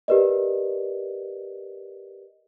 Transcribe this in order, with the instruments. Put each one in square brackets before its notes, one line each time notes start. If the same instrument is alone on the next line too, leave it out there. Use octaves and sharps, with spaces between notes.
[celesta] G4 A#4 B4 D5 D#5